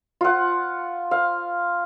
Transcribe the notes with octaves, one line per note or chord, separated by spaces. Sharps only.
F4 F#5
F5